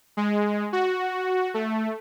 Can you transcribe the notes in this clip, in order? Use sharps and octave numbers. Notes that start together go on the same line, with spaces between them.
G#3
F#4
A3